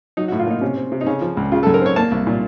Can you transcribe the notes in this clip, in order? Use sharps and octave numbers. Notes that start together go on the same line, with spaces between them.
F#3 D#4
F#4
A2
F4
A#3 D#4
C3 C#4
C4
C3
D#4
C#3 C#4
F3
C#2
C#3 F4
A4
F#2
A#4
C4 C#5
A#3 A5
C2
A#2